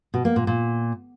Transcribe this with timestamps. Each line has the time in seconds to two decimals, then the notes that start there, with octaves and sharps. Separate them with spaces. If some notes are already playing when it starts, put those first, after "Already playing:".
0.14 B2
0.25 A#3
0.36 A#2
0.47 A#2